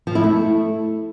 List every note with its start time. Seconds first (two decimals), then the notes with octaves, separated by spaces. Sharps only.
0.07 F3
0.15 E4
0.24 A3